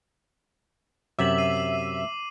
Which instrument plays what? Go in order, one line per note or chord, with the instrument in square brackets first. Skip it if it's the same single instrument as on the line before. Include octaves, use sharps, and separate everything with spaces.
[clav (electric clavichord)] F#2 C3 F#3 [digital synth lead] E5 [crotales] D6 F#7
[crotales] C7 D#7
F#7